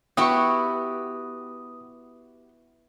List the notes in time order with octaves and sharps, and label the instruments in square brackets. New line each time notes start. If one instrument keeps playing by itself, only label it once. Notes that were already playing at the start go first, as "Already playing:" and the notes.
[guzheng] B3 E4 F#4 [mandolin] G4 C#6 [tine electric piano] D#6